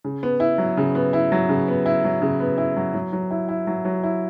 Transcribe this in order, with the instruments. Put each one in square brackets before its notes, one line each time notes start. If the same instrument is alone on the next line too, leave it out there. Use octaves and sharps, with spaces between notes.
[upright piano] C#3
B3
E4
F#3
C#3
B3
E4
F#3
C#3
B3
E4
F#3
C#3
B3
E4
F#3
F#3
F#3
E4
E4
F#3
F#3
E4